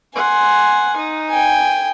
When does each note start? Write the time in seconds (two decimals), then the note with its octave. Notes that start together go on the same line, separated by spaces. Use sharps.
0.16 F#5 G#5 C6
0.97 D#4
1.31 G5 G#5